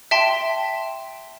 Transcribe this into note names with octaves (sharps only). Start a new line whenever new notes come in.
E5 G5 A5 C6